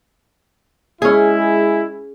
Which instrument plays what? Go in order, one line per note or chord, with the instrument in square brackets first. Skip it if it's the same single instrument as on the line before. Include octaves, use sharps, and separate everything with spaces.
[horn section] G#3 E4 [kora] C#4 G#4